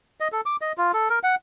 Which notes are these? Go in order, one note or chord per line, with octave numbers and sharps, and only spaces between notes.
D#5
A4
D6
D#5
F4
A4
A#4
F#5